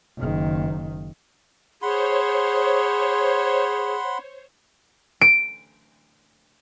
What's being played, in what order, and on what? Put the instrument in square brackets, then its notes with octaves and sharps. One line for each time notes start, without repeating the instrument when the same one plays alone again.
[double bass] F#1 D#3
[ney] G#4 [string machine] C5 C#5 [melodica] F#5 B5 C6
[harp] D7